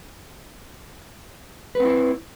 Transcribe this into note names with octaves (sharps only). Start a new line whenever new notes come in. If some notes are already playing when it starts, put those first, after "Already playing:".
C4 E4 B4